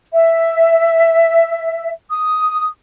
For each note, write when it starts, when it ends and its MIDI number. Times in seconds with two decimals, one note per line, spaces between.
0.13 1.91 76
2.10 2.67 87